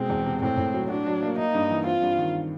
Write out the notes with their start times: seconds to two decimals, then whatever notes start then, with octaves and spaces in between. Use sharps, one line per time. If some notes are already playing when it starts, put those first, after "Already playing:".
Already playing: B2 G#3 C4
0.10 E2
0.26 C3
0.42 A2 C4
0.57 A2
0.74 F#3
0.89 D4 F#4
1.06 F#3
1.23 A#3
1.38 A#3 D#4
1.55 G2
1.70 E3
1.86 C4 F4
2.02 G2
2.18 D#3